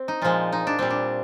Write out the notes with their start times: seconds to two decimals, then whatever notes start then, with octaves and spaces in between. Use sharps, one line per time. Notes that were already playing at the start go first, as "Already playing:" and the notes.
Already playing: C4
0.08 D#4
0.22 A#2 F3 G#3 F4
0.52 D#4
0.67 D4
0.79 A#2 G3 C4
0.90 D4